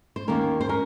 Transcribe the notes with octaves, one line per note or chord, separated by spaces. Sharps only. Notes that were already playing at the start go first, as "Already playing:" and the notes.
C5
D#2 D#3 A#3 C#4 A#4
C5
C#4 A#4